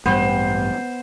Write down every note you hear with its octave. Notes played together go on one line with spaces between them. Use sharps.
A1 G2 G3 B3 C5 G5